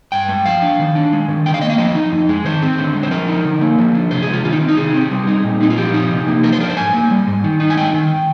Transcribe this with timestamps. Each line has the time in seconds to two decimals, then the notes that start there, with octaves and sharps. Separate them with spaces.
0.12 G2 G5
0.29 G#3
0.46 F3 F5
0.62 D4
0.80 D#3
0.95 D4
1.13 G#3
1.28 D#3
1.46 D3 G5
1.54 F5
1.61 A#3 D#5
1.70 F5
1.78 F3 D#5
1.95 D#4
2.12 F2
2.29 G#3
2.45 D#3 C5
2.62 C4
2.78 D3
2.95 G#3
3.03 C5
3.11 F3 A#4
3.28 D#4
3.45 D3
3.61 A#3
3.79 F3
3.95 D4
4.11 C3 C5
4.22 G#3 G#4
4.33 F4
4.44 D#3 F4
4.53 D#4
4.61 C4
4.68 D#4
4.77 C3 G#4
4.94 C4
5.11 G3
5.27 D#4
5.44 A#2
5.61 C4 D#4
5.70 F4
5.77 F3 G4
5.94 D#4
6.11 C3
6.28 A#3
6.43 F3 A#4
6.53 C5
6.60 D4 A#4
6.70 C5
6.77 G#2 G#5
6.94 A#3
7.11 G3
7.27 G#2
7.44 D#3
7.60 D#4
7.70 G#5
7.76 G#3 G5
7.94 D#3